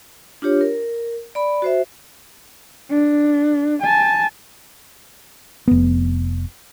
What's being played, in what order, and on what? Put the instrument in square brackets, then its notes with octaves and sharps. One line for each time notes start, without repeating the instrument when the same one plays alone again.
[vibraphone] D4 F4 G4 C#5
A#4
D5 B5
F#4 C5 E5
[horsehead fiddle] D4
G#5 A5
[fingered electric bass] F1 B3